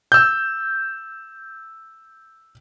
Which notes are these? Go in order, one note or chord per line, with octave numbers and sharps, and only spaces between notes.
E6 G6